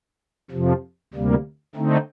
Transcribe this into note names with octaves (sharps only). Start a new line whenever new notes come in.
F2 C3 F3
D2 C3 G3 A#3
D3 A3 C4 D#4